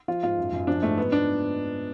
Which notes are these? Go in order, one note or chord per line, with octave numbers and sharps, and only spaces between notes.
F3 F4
G#2 F4
F#2
F#2
F3 D4
G#2 A3
F3 B3
D4